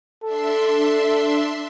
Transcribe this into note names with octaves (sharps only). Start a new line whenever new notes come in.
D4 A4 E5 C6